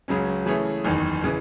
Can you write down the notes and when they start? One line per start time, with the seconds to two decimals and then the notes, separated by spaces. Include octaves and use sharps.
0.08 C#2 C#3 F#3 C#4
0.46 C#3 E3 A3 C#4 G#4
0.85 F#1 E2 D#3
1.24 C#3 E3